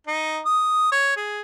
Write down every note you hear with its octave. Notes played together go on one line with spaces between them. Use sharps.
D#4
D#6
C#5
G#4